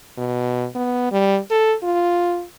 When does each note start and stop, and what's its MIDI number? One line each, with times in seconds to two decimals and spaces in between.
0.18 0.66 47
0.75 1.07 59
1.12 1.39 55
1.51 1.75 69
1.83 2.44 65